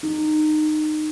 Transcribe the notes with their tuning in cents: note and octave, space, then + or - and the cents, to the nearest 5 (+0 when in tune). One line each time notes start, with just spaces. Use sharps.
D#4 -20